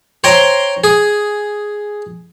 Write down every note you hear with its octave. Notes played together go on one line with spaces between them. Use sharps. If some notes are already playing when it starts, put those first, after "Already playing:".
C5 C#5 G5 A#5 C6
G#4